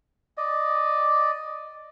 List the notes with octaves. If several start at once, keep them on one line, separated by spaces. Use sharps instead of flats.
D5 D#5